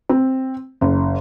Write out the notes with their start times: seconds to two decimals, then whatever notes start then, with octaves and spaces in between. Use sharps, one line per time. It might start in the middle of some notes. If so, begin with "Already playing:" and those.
0.09 C4
0.81 F#1